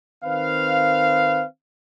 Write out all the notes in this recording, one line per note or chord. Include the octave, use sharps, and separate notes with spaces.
D#3 C4 B4 F5